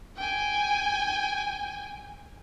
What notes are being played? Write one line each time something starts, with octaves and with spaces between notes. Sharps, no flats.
G5 G#5